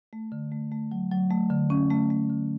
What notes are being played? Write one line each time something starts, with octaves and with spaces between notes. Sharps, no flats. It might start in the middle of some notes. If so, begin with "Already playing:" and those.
A3
D3
A3
A3
F#3
F#3
A3
D3
C#4
A3
A3
D3